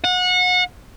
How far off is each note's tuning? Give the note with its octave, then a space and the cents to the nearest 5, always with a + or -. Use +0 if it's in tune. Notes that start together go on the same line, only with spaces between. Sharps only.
F#5 -30